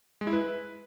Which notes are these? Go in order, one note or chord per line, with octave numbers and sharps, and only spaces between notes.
G#3
E4
B4